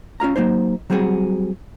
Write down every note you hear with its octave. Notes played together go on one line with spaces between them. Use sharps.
C#4 F4 F5 A#5
F#3 A#3 D#4 C5
F#3 G3 C4 F#4 G#4